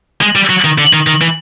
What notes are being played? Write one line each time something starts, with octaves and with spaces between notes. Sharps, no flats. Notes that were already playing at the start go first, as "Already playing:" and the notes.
G#3
G3
F#3
D#3
D3
D#3
D#3
E3